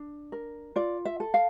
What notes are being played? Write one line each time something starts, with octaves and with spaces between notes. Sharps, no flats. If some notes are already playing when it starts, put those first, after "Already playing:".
Already playing: D4
A#4
F4 D5
E5
A4
F5